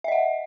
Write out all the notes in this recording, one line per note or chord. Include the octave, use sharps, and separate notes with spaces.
D#5 E5 F#5